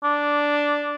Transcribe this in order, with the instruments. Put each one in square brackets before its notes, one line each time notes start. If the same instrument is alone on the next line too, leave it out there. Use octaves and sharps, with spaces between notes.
[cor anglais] D4